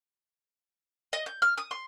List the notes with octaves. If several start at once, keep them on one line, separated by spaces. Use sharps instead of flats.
D#5
G6
F6
D#6
C6